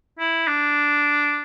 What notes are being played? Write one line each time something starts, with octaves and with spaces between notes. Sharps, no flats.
E4
D4